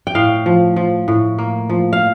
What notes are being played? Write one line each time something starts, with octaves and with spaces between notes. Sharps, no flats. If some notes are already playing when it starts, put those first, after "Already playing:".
G5
A2 F5
F3
F3
A2
A#3
F3
F5